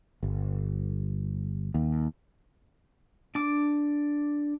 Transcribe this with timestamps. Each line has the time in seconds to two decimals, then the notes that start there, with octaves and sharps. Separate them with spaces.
0.23 G1
1.74 D#2
3.35 D4 D6